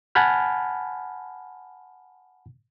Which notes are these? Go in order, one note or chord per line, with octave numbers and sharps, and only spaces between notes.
F#5 G#5 A5 B5 F6